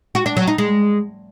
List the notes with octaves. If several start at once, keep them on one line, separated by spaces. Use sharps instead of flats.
F#4
D4
F#3
D#4
G#3